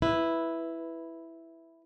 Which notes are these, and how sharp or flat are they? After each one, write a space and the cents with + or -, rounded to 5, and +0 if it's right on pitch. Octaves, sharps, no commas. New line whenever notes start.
E4 +0 B4 +0